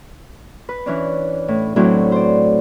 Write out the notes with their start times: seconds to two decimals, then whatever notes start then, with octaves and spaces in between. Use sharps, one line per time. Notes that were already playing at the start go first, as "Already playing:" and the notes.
0.69 B4
0.86 E3 C#4 D4
1.48 A2
1.76 A2 F#3 A3 C4 D4 E4
2.12 C5 D5